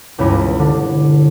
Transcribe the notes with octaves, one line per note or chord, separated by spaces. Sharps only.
E1 C#2 G2 C#4 E4 D#5
D3